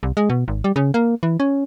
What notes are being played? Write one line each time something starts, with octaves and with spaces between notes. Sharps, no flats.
C2
G#3
B2
G#1
G3
C#3
A#3
E3
C#4